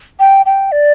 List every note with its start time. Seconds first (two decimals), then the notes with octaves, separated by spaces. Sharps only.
0.20 G5
0.46 G5
0.72 D5